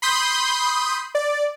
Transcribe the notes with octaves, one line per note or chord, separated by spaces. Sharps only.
B5 C6 D#6 G6
D5